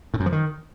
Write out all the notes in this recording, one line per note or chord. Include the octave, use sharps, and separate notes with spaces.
A2
F#2
F3
D#3